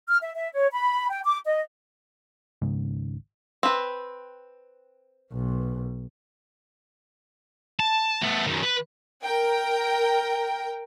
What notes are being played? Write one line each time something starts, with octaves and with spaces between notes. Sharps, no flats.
F6
E5
E5
C#5
B5
G5
D6
D#5
G#1 C#2 G#2 C#3
C4 B4
B1
A5
A3 B3
F#2 D#3
B4
A#4 G5